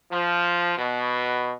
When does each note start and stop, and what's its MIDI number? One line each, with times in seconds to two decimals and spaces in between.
0.11 0.71 53
0.77 1.52 47